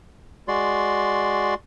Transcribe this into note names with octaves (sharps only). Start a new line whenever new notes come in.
G#3 F#4 D5 C6